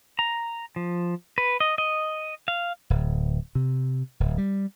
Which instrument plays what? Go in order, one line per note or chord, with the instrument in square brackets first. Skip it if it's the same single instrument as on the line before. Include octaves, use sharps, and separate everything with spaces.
[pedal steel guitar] A#5
F3
B4
D#5
D#5
F5
[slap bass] D1
C3
D1
G3